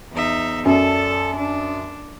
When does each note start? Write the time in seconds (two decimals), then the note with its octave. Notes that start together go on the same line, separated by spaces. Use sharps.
0.12 E2 D#4 E5
0.65 F#2 A4 D5 A5
1.36 D4